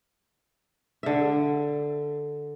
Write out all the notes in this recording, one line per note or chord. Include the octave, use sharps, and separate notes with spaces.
D3 E5